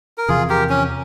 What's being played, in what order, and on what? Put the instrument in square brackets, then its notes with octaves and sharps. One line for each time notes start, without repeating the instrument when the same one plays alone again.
[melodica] A#4
[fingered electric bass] E2 C3 F3 [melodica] F4 G#4
[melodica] G4 A#4
C#4